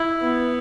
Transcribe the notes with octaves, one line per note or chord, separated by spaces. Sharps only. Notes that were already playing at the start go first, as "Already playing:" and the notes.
Already playing: E4
B3